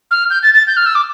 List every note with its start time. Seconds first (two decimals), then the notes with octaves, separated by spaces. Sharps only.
0.11 F6
0.30 G6
0.43 A6
0.54 A6
0.67 G6
0.76 F6
0.86 E6
0.95 D6